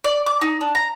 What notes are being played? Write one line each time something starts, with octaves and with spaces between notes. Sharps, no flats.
D5
D6
D#4
D4
A#5